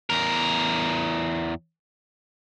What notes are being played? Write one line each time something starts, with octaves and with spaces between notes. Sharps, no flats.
E2 A#4